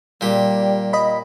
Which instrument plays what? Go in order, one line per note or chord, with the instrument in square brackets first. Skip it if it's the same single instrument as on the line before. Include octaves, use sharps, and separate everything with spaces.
[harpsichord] A#2 G4 [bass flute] G3
[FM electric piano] D#5 B5